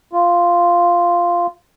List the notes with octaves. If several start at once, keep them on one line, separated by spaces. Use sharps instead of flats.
F4